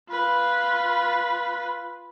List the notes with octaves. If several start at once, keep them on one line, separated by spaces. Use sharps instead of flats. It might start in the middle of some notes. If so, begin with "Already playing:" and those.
F4 B4